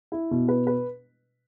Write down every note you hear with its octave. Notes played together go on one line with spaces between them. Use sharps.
E4
B2
B4
B4